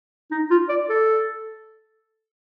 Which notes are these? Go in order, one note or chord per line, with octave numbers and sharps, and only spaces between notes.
D#4
F4
D5
A4